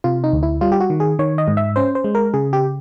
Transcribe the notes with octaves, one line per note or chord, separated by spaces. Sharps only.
C3 F4
D#4
D2
E4
G3 F4
G4
F#4
D#3
G#4
D#3 C#5
D#5
G#2
E5
C#4 C5
C5
G#3
A#4
C#3 G#4
G4